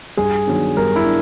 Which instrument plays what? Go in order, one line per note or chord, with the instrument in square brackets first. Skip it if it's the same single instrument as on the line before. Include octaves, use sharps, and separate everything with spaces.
[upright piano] G2 [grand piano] G#4
[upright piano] D#3 F#3 B3 D4
[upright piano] G2 [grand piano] A#4
[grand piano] E4
[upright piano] D4